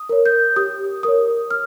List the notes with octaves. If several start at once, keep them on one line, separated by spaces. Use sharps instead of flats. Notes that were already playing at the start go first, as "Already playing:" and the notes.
Already playing: D#6
A#4 C#5
G6
G4 D#6
A#4 C#5 D#6
F6